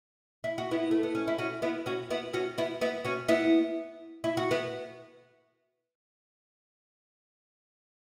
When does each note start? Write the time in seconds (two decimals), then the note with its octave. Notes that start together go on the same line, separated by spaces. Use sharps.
0.44 E4
0.58 F#4
0.71 B3 E4
0.91 A3
1.03 B3
1.15 C#4
1.27 E4
1.38 C#4 F#4
1.62 B3 E4
1.86 C#4 F#4
2.10 B3 E4
2.33 C#4 F#4
2.58 B3 E4
2.81 B3 E4
3.05 C#4 F#4
3.28 B3 E4
4.24 E4
4.37 F#4
4.51 B3 E4